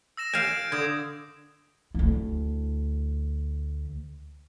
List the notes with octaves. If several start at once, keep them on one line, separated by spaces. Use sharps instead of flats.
E6 A#6 E7
F5 G#5 G6 D7 E7
D3 D#6 G#6
D2 E4